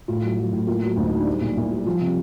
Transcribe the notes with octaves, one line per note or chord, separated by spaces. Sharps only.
A2 F4
F#3
F#3
A2
A#3 F4
F#3
D2
D#4
F#3
D4
G3 D#4
A#2
A#2 E4
G3
F3 F4
C3